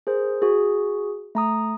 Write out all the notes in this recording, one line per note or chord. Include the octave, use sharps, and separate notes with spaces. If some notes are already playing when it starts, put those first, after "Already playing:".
G#4 A#4 C5
F#4 G#4
A3 A#5 D#6